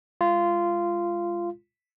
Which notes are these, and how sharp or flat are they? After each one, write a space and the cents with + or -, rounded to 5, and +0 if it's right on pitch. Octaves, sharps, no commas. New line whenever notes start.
G#3 -25 F4 -15